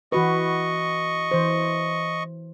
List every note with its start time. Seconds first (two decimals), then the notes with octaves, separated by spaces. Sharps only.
0.12 E3 F#4 B4 D#5 C#6
1.31 E3 C5